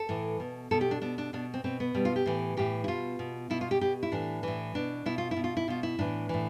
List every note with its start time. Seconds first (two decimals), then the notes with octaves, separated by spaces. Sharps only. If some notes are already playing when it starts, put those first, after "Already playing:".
Already playing: A4
0.09 A2 E3
0.40 B2
0.71 B2 A4
0.81 G4
0.91 D4
1.02 B2 D4
1.18 D4
1.33 B2 D4
1.54 C4
1.64 B2 C4
1.80 B3
1.94 B2 G3
2.05 F4
2.16 G4
2.26 A2 E3
2.57 A2 E3 G4
2.84 E4
2.88 B2 F4
3.19 B2
3.50 B2 E4
3.61 F4
3.71 G4
3.81 B2 G4
4.03 E4
4.12 A2 E3 D4
4.43 A2 E3
4.75 B2 D4
5.06 B2 E4
5.18 F4
5.31 E4
5.36 B2
5.44 F4
5.57 E4
5.68 B2 F4
5.83 E4
5.99 A2 E3 D4
6.29 A2 E3